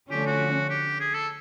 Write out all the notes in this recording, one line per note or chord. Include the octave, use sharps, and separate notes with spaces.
D3 F3 A3 C#4 G4
F#4
G4
G#4
A4